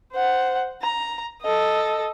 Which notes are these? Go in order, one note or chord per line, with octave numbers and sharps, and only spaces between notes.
C5 F#5
A#5
A4 D#5